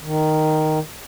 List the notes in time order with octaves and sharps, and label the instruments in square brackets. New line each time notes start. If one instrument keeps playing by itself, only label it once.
[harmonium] D#3